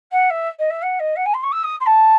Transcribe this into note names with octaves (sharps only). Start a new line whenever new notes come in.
F#5
E5
D#5
E5
F#5
D#5
F#5
G#5
C6
C#6
E6
D#6
C6
A5